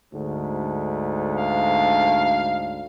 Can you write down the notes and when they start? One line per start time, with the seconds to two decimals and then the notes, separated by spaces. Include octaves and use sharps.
0.13 D2 G#2 D3
1.35 F5